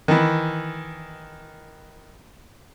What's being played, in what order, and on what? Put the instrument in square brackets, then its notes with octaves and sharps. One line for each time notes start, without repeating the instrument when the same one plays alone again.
[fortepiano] D#3 E3